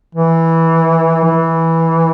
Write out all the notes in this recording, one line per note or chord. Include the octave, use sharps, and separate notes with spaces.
E3
E3